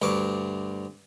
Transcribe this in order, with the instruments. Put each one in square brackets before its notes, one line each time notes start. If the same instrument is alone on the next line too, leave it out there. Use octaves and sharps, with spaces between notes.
[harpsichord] D2 G2 C#6 D6